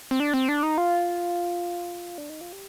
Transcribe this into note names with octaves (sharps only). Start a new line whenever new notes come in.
C4
D4
C4
D4
D#4
F4
D4
D#4
F4
G4